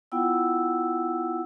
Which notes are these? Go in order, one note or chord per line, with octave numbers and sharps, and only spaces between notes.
B3 E4 F4 F#5 G5 E6